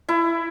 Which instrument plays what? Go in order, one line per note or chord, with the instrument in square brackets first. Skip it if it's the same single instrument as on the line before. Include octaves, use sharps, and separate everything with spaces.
[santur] E4